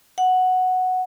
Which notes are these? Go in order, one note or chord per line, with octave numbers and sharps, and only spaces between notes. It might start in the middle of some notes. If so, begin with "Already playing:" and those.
F#5